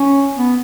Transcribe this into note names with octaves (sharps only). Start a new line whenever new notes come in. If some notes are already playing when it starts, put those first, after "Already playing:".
Already playing: C#4
B3